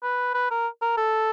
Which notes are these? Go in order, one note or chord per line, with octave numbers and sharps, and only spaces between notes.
B4
B4
A#4
A#4
A4